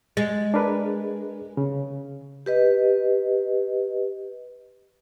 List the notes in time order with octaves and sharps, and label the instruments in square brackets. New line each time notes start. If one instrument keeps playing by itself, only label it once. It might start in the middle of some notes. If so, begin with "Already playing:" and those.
[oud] G#3 [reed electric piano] A6
[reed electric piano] D4 A#4 B4
C#3
[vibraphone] G4 B4 D#5